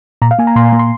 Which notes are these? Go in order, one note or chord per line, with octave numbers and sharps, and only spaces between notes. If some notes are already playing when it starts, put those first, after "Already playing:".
A#2 A#5
F5
A#3 G#5
A#5
A#2 C6
A#3
C6